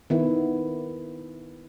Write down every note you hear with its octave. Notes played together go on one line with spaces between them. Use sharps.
D#3 B3 E4